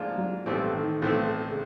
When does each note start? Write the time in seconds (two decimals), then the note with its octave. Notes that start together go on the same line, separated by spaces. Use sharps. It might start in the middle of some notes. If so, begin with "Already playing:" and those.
Already playing: G#2 F3 A#3 D4 F4
0.18 F#3
0.46 B1 A2 E3 G3 A3 C4
0.73 D#3
1.02 B1 A2 E3 A3 C4
1.50 C#3